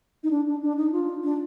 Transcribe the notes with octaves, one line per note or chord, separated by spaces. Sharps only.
D#4
D4
D4
D4
D#4
F4
D4